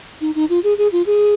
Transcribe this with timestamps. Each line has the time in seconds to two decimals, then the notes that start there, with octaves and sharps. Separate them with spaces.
0.21 D#4
0.35 D#4
0.50 F4
0.64 G#4
0.78 G#4
0.92 F4
1.06 G#4